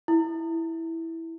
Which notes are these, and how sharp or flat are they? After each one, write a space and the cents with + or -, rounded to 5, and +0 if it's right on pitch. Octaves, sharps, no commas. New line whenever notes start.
E4 -5